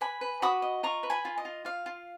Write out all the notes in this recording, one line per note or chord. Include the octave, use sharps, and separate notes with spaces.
B4 G#5 B5
B4
F#4 B5 D#6
D#5
F4 A#5 C#6
B4
G#5 B5
F4
D#5
F4
F4 F5
F4